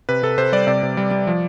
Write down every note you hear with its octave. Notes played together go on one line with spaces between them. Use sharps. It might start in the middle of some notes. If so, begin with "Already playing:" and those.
C3 B4
C3 A4
C3 C5
G3 D5
C3 D5
C3
G3
G3
F3